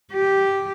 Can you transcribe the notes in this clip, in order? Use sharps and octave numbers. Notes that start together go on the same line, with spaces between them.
G4